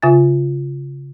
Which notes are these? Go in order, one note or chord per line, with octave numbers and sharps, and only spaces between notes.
C#3 F4 E5 G#5 A6